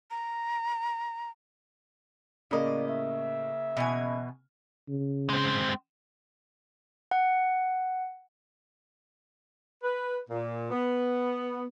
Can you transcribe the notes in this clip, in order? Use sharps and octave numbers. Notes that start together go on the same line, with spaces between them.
A#5
A2 C#3 A#3 D5 D#5
E5
B2 E3 G#5
C#3
G#3 C4
F#5
B4
A#2
B3